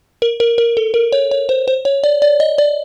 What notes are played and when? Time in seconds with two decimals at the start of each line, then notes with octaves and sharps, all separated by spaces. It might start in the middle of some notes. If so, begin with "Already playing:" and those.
0.22 A#4
0.40 A#4
0.58 A#4
0.77 A4
0.94 A#4
1.12 C#5
1.31 C#5
1.49 C5
1.68 C5
1.85 C#5
2.04 D5
2.22 D5
2.40 D#5
2.58 D5